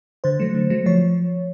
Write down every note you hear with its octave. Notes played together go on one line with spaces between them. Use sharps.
D3 C5
F#3 A3
D3
F#3 A3
F3 C#5